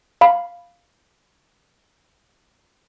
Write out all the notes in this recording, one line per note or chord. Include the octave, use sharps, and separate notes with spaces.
F5 B5